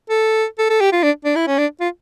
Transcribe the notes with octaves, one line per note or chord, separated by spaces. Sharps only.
A4
A4
A4
G4
F4
D4
D4
E4
C#4
D4
F4